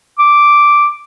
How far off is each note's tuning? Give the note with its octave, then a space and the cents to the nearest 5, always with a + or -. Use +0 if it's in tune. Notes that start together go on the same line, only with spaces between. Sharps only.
D6 -5